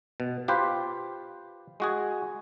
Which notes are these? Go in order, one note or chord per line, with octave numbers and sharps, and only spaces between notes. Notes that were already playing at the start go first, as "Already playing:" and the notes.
B2
F4 G4 B4 C5
G#3 F#4 G#4